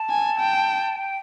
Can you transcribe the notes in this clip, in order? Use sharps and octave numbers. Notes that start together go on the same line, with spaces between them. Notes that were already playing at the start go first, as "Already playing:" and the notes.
Already playing: A5
G#5
G5
G5